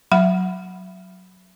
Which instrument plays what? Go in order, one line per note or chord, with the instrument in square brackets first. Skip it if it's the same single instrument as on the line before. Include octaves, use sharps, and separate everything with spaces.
[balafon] F#3 F#5 B5